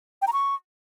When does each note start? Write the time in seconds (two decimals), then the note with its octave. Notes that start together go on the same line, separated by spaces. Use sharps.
0.22 G5
0.27 A#5
0.33 C#6